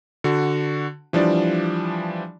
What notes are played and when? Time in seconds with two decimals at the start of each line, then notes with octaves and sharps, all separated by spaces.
0.24 D3 F#4
1.13 E3 F3 G3 D4 D5